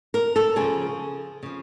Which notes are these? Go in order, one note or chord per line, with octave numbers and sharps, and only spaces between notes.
A#4
A4
C#3 F3 G#4
C#3 F3